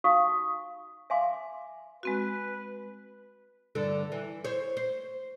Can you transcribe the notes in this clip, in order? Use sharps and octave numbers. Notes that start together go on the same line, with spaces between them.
D#4 F#4 F5 C#6 D#6
E5 F5 G#5 C6 D6
G#3 C4 F#4 B4
G2 D3 A4
E3
C5 C#5
C5